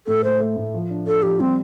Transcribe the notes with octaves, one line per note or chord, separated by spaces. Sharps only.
A2 A4
A3 C5
A3
A2
F3
D4
D4 A4
F3 G4
G3 C4